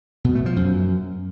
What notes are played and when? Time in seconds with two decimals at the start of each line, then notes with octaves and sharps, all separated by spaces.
0.24 B2
0.35 A3
0.46 F3
0.56 F#2